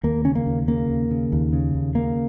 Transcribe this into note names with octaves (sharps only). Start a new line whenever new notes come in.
D#2 A#3
C#3 C#4
A#3
D#2
C#3 A#3
D#2
C#3
D#2
C#3
D#2
C#3 A#3